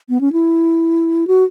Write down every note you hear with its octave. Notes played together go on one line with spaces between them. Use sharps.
B3
C#4
E4
F#4